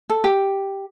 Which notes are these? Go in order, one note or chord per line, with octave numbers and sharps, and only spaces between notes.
A4
G4